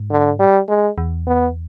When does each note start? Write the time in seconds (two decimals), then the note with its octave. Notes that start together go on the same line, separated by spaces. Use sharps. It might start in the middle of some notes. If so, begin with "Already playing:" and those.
Already playing: G#2
0.11 D3
0.39 G3
0.68 G#3
0.98 E2
1.27 B3